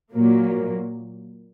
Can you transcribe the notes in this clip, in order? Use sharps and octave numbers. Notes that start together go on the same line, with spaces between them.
A#2 F#3 A#3